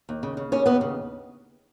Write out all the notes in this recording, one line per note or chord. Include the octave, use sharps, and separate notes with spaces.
D#2
C#3
C#3
D#2 C#4 C#5
D#2 B3 B4
C#3